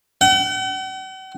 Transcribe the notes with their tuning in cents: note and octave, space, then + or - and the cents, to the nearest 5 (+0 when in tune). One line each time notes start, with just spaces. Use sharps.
F#5 +45